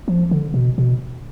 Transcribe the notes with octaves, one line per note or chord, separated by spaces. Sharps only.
F3
D3
B2
B2